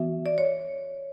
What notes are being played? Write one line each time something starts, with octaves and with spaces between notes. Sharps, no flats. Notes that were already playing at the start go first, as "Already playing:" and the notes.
Already playing: E3 B3 F#4 E5
D5
C#5